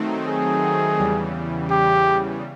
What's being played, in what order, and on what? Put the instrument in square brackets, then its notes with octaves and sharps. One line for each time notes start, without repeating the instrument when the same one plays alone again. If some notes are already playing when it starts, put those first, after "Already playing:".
Already playing: [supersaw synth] D#3 F#3 A3 C4 D#4
[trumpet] G#4
[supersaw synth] E2 C#3 E3 G3
[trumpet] G4